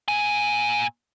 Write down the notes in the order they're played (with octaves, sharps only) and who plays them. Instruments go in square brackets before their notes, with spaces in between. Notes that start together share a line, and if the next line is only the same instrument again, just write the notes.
[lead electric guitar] A#2 G#5